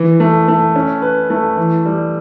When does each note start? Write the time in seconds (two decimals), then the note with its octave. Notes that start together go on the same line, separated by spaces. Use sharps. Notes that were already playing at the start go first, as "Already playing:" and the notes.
Already playing: E3
0.20 A3
0.48 A3
0.76 C#4
1.02 B4
1.30 A3
1.57 E3
1.86 G3